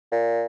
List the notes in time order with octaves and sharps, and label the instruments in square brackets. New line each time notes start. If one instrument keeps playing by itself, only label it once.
[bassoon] A#2